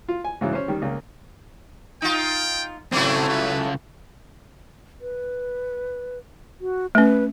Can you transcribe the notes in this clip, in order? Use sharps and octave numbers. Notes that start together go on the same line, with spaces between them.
F4
G#5
G#2 C#3 E3 F#3
C#4 C5
D#3 G3
C#2 C#3 A#3
D#4 F4 G5
C#3 F#3 A3 C4 E4 G#4
C#3 F4 B4
B4
F#4
A3 C#4 B4